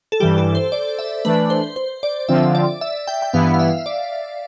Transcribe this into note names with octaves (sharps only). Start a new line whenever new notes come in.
A4
G2 E3 G3 G4
A4
C5
D5
E5
E3 A3 D4 B4
C5
C5
D5
D3 F3 C4 F4 E5
D5
E5
G5
G5
G2 E3 B3 E4 F5
F5
E5
D5